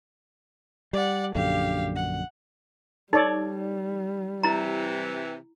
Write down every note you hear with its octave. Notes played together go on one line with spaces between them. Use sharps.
G3 D5 F#5
A#1 F#2 D3 G4 F5
F#5
G3 D#4 A4 C#5 D5
C3 E3 E4 A#5